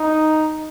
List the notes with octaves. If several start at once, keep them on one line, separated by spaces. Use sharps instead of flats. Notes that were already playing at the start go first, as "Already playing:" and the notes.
Already playing: D#4